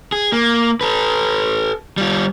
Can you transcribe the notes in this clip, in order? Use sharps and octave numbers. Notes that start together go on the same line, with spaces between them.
G#4
A#3
A4 B4
G3 F4